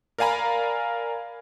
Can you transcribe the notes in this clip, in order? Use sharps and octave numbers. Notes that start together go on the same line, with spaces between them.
A#4 D5 F5 G#5 A#5 B5